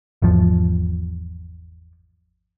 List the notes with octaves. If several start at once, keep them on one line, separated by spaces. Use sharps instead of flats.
G#1 E2 F3